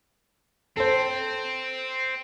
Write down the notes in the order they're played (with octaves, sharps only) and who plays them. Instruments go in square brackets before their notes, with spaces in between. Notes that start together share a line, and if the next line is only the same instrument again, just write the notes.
[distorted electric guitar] C4 [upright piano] A4 C5